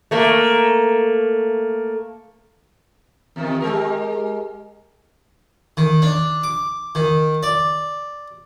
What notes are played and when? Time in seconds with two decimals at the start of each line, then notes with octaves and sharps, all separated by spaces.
0.11 A3 A#3
3.36 E2 C3 D#3
3.60 G#3 G4 A#4
5.77 D#3
6.02 D4
6.44 D6
6.95 D#3
7.43 D5